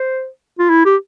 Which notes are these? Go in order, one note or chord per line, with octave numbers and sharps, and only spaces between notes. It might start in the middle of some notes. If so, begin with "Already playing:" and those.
Already playing: C5
F4
E4
G4